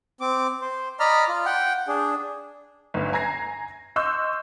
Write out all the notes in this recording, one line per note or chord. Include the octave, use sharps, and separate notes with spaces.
C4 D6
C5
D5 D#5 A#5 B5 F6
F4
F#5 G5
D4 G#4
G1 D2
G#5 A#5 G#6 A#6 C7
D#5 C6 C#6 E6 F#6 G6